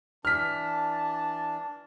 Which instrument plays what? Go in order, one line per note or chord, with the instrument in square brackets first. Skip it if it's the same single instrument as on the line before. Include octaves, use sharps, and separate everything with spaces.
[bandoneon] E3 D4 [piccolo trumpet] A5 [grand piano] F6 B6